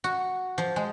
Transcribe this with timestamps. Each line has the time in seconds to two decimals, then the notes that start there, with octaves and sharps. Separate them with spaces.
0.04 F#4
0.58 F3
0.76 G#3